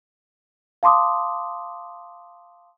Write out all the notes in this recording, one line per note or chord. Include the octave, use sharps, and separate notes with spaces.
F5 A5 C6 D6 D#6